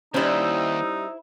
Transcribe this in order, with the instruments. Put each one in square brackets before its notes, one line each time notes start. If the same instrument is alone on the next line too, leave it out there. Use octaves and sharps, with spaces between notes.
[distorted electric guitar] D#2 [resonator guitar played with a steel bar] G3 C#4 [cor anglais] D#4 [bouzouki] E4 C5